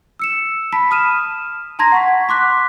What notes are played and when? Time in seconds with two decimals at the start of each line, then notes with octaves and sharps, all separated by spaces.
0.19 E6 C#7 E7
0.72 A5 B5 B6
0.91 D#6 F6 D#7 E7
1.79 A5 A#5 C6 G#6 A#6
1.92 F#5 C#6 B6
2.29 C6 D6 F#6 B6